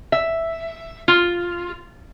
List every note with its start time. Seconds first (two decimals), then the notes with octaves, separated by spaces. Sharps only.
0.12 E5
1.08 F4